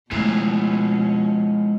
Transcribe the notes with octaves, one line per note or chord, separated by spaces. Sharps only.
B2 F3 G#3 A3 C#4 E4 F5